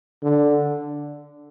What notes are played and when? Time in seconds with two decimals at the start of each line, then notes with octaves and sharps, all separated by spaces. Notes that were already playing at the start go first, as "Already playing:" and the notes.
0.23 D3